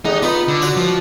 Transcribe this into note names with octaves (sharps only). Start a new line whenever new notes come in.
A1 E2 D#4
B3 D#4 F4 B4
D3
F#4 C#5 D5
F3